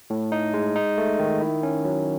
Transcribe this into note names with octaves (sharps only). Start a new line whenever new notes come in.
A2
D#4
G#3
D#4
A3
D#3
E4
C#4
F#3